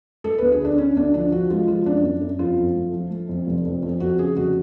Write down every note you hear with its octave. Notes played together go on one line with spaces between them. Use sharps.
A3 A4
D2 B4
G#4
D3 D4
D3 C#4
D2 D4
F3 D4
F3 F#4
G#3 F4
F3 F4
F#2 D4
F#2
F#2
F2 F4
F2
A3
F3
A3
F2
F1
F2
F2
F2 F#4
C#3 G#4
F1 F#4